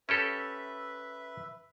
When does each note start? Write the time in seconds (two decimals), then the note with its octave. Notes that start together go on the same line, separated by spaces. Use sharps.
0.09 C#4 G4 A4 B4 E5